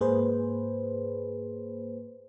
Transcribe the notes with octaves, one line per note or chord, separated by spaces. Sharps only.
G#2 A#3 G#4 B4 C5